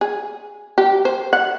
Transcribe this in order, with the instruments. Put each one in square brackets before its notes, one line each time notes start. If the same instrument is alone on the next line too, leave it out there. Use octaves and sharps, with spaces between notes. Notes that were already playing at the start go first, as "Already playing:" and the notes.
[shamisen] G#4
G4
C5
F#5